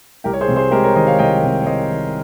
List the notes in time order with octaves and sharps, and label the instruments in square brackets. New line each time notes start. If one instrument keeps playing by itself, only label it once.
[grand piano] C2 G4 A#4
C#5
G#4 C5
C3
G#4 C5
G#3 G4 A#4
A#4 C#5
D#3 C5 D#5
C#5 F5
C2 D#5 G5
C3
C#5
G#3 C5 D#5
D#3